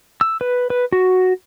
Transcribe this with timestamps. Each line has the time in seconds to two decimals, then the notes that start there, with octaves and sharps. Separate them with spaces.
0.21 E6
0.41 B4
0.70 B4
0.92 F#4